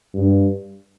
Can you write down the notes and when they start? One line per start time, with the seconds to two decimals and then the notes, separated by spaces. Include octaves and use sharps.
0.14 G2